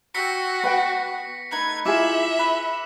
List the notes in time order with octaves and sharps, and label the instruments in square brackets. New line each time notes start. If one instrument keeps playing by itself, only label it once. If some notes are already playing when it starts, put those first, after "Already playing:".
[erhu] F#4 [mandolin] G5 A5 E6 [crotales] A#6 B6 C#7
[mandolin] B3 [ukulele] B4 F#5 G5
[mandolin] A3 D#4 B4 [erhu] G#6
[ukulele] E4 F4 G#4 [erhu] E5 [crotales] D6 E6 E7
[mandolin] B4